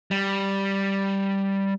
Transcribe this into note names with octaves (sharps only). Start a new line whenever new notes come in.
G3